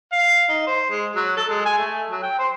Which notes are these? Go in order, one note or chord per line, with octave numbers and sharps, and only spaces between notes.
F5
D#4
C5
G#3
F#3
A4
G#3
G#5
A3
F#3
G5
C5